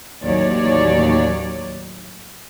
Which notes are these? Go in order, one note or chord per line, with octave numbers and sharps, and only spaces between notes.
A1 D#2 F#3 C#5 D5